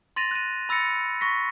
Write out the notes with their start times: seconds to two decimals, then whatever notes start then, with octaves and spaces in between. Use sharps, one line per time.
0.16 C6 A6 A#6 D#7 F7
0.31 F#6 D#7
0.69 B5 E6 A6 A#6 C#7
1.21 C#6 A#6 B6